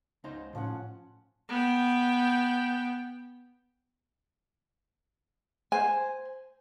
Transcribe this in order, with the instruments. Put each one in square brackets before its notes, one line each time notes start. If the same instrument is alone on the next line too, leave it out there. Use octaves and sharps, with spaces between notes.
[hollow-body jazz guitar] C#2 D#4 C5
[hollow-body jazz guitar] A2 [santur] F3 C#4 F#5
[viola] B3 G5
[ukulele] C5 G#5